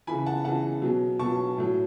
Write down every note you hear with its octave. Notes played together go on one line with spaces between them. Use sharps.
C#3 E3 G#5 B5
F#5 A5
C#3 E3 F#5 A5
B2 F#3
B2 F#3 A5 C#6
A2 F#3